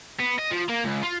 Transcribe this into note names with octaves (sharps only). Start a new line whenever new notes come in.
B3
D#5
F3
A#3
C#2
F4